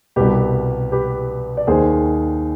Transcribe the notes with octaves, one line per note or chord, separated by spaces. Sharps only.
C2 B2 G4 B4
G4 B4
D5
D#2 D#3 G#4 C5